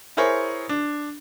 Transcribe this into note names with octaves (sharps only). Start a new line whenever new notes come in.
E4 G#4 A#4 C5 C#5
D4